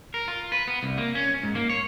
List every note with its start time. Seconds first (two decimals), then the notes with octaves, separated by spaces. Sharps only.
0.14 A#4
0.28 F4
0.52 B4
0.68 B3
0.83 C2
0.98 A#3
1.15 C#4
1.43 G#2
1.55 A#3
1.69 C#5